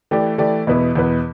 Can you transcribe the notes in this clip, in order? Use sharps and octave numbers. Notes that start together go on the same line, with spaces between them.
E3 A3 G4 D5
E3 A3 G4 D5
E2 B2 B3 E4 B4
E2 B2 B3 E4 B4